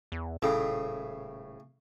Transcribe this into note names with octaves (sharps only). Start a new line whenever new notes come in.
E2
D#1 A2 C#3